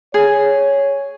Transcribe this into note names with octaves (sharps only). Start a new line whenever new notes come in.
G#4 C#5